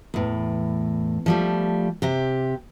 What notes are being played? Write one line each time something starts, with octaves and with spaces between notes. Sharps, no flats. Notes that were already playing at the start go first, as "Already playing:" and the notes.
E2 A2
F3 G3 A3
C3 G4